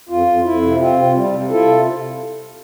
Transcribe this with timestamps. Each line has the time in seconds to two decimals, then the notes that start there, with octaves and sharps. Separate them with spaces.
0.09 F2 F4
0.26 F2
0.44 F2 E4
0.62 C3
0.80 C4 F4
0.97 C3
1.15 G3
1.32 C3
1.50 E4 F4 A4
1.68 C3